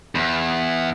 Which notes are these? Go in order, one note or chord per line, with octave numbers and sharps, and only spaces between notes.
E2